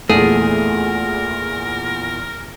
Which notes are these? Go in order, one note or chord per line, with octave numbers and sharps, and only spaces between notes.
E2 A#2 A3 G#4 A#4